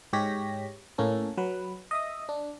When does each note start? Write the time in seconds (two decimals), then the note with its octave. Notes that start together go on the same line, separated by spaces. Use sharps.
0.13 G#2 G#3 G4 C#5 A#6 B6
0.98 A2 A#3 C#4 A4
1.38 F#3 B4
1.91 D#5 E5 D#6
2.29 D4